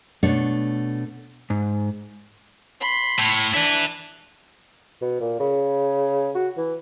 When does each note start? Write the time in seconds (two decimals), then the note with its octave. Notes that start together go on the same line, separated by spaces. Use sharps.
0.23 B2 A3 D4 C#5
1.50 G#2
2.80 B5 C6
3.19 A2
3.54 D4 E4 B4
5.01 B2
5.21 A#2
5.39 C#3
6.35 F#4
6.57 E3